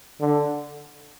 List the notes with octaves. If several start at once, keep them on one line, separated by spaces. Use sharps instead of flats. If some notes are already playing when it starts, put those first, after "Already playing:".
D3